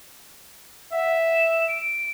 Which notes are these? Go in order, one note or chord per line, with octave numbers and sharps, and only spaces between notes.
E5 F#5
E7
D7